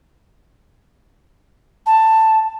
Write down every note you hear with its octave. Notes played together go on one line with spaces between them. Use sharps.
A5